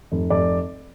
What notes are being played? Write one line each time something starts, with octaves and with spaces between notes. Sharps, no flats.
F1
F1 D5